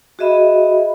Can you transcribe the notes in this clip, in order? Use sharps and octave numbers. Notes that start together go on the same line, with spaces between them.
F#4 G#4 D#5 E5 B5